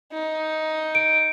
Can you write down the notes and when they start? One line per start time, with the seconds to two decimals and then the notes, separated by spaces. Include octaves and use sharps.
0.13 D#4
0.95 D7